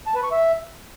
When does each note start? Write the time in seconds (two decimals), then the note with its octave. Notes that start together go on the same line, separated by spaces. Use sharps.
0.07 A5
0.15 B4
0.23 C#6
0.32 E5